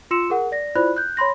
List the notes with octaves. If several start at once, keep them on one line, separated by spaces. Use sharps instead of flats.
F4 C6 E6 C#7 E7
G#4 A#4 F#5
D5 A#6
E4 F4 C5 D5 B5 F#6
F#6 G6
C#5 B5 C6 A#6